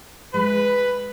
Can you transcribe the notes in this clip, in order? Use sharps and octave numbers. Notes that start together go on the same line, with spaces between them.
G#3 B4